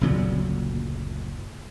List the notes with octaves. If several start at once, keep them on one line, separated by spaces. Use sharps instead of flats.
F#1 D2 A#2 F#3